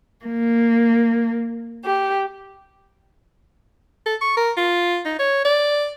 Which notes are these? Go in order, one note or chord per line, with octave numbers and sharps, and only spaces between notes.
A#3
G4
A4
C#6
A#4
F4
D#4
C#5
D5